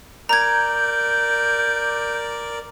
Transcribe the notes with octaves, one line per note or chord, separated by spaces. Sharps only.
A#4 D5 A#5 G6 G#6